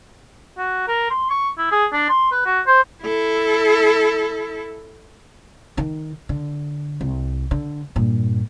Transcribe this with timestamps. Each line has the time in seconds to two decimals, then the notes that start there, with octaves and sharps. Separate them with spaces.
0.58 F#4
0.88 A#4
1.10 C6
1.30 C#6
1.58 E4
1.72 G#4
1.93 D4
2.09 C6
2.32 B4
2.46 F#4
2.67 C5
3.04 E4 A4
5.77 D#3 D#4
6.29 D3
7.01 C2
7.51 D3
7.96 G2 A#2